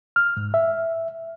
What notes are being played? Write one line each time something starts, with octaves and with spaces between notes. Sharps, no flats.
F6
G#2
E5